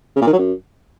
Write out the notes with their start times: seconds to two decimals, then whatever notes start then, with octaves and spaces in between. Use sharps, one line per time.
0.16 C#3
0.22 A#2
0.27 D#3
0.33 F#3
0.38 F#2